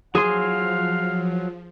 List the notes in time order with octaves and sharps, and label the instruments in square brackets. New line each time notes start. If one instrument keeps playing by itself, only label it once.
[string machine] F3 [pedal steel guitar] F#3 C6 [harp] G#4 [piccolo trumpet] F5